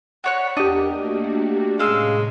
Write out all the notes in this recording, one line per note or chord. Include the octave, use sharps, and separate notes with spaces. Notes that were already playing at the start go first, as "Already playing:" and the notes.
F#4 C#5 D5 E5 B5 F#6
E2 D4 G4 A#4 D#5
A3 A#3 F#4
A2 C3 G#3 C#4 F5 E6